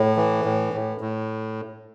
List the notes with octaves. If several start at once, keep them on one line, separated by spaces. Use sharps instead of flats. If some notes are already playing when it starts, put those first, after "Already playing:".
Already playing: A2
E3
A2
A2
A2